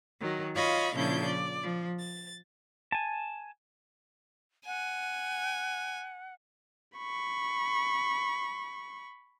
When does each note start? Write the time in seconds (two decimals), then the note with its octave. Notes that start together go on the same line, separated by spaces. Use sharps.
0.20 D#3 F#3
0.55 F4 C#5 D#5 F5 B5 C#6
0.94 A#2 C#3 F3 D4 E4 G6
1.25 D5
1.62 F3
1.99 A6
2.92 G#5 A5
4.66 F#5 G#5
6.97 B5 C#6